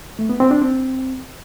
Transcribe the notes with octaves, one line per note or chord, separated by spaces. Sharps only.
A3
B3
C4
D4
C4